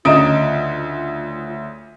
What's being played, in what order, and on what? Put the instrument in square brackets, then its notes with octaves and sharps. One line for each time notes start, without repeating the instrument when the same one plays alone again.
[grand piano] D2 C#3 D7 [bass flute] F4 [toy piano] D#5 A#5 D#6